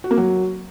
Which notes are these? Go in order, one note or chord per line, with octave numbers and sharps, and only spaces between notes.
F#4
A#3
F#3